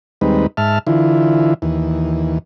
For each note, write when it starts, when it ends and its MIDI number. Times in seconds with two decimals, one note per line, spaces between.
0.21 0.47 39
0.21 0.47 55
0.21 0.47 56
0.21 0.47 60
0.21 0.47 63
0.21 0.47 71
0.57 0.79 44
0.57 0.79 76
0.57 0.79 81
0.57 0.79 89
0.87 1.54 50
0.87 1.54 52
0.87 1.54 64
0.87 1.54 65
1.62 2.38 39
1.62 2.38 52